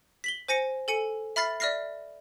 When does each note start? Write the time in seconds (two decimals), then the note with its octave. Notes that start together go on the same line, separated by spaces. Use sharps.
0.24 B6 F#7 G7
0.48 C5 G#5 A#6 C#7
0.88 A4 G#5 C#7
1.36 E5 B5 F6 A6 C7
1.60 D5 E5 F6 A#6 C7